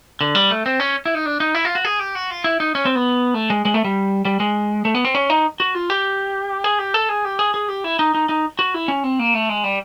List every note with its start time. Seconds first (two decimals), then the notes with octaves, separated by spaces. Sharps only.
0.21 D3
0.35 G3
0.51 A3
0.66 C4
0.80 C#4
1.06 E4
1.15 D#4
1.26 D4
1.40 D#4
1.55 E4
1.65 F4
1.75 F#4
1.85 G#4
1.99 G4
2.15 F#4
2.30 F4
2.44 E4
2.60 D#4
2.75 C#4
2.85 C4
2.95 B3
3.34 A3
3.50 G#3
3.65 G#3
3.74 A3
3.84 G3
4.25 G3
4.40 G#3
4.85 A3
4.95 B3
5.05 C4
5.15 C#4
5.30 D#4
5.60 F#4
5.75 F4
5.90 G4
6.64 G#4
6.79 G4
6.94 A4
7.09 G#4
7.25 G4
7.39 G#4
7.54 G#4
7.68 G4
7.84 E4
7.99 D#4
8.15 D#4
8.29 D#4
8.59 F#4
8.74 E4
8.88 C#4
9.04 C4
9.19 A#3
9.34 A3
9.49 G#3
9.64 G3